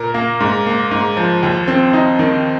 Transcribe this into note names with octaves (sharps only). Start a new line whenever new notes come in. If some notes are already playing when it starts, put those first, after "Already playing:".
Already playing: A#2 A#4
A#3
G#2
A#3
G#2
F3
D#2
C4
D#4
D#3